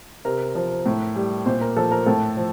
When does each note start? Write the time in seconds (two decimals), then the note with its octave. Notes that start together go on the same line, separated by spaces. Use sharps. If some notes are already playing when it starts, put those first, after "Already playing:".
0.25 C3 A#4
0.55 F3
0.86 A2
1.16 G3
1.46 A#2 C5
1.61 A#4
1.76 F3 A4
1.91 A#4
2.06 A2 A4
2.37 F3